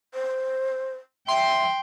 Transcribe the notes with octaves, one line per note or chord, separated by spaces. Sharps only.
C5
E5 G5 C6